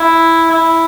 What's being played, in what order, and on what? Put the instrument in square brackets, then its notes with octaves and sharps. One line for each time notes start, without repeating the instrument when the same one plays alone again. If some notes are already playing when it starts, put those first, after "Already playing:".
Already playing: [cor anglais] E4
E4